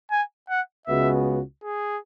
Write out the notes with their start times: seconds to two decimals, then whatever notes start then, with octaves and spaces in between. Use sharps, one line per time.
0.11 G#5
0.50 F#5
0.87 C#2 C#3 G#3 B3 F#4 E5
1.64 G#4